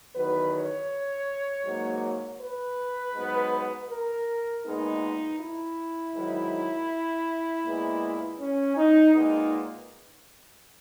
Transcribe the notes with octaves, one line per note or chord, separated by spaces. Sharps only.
E2 D#3 F#3 B3 B4
C#5
G#2 F#3 A#3
B4
G#2 F#3 B3
A#4
A#2 G#3 B3 D#4
E4
G#2 D#3 F#3
A#2 G#3 B3
C#4
D#4
A#2 G#3 B3 D#4